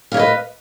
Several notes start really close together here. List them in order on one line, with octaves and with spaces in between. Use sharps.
F5 C#5 D#5 B4